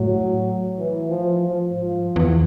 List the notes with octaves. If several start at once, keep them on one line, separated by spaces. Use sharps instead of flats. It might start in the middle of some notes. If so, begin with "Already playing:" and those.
Already playing: A2 F#3
E3
F3
F3
G#2 F3
G2
E2